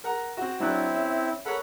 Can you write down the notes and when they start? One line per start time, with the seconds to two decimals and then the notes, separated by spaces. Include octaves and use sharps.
0.04 A#4 F#5 A#5
0.37 C4 F#4
0.60 F#3 C4 D4 E4 F#6
0.91 C#4 E5
1.45 A4 A#4 C#5 F#5 B5